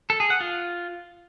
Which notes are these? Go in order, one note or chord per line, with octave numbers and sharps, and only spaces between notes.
A4
G#4
F#5
F4